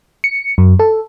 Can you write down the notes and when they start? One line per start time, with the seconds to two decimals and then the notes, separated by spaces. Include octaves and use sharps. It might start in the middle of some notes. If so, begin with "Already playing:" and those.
0.24 C#7
0.58 F#2
0.79 A4